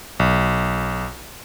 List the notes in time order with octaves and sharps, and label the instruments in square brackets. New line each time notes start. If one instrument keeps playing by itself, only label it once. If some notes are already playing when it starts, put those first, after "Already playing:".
[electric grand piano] B1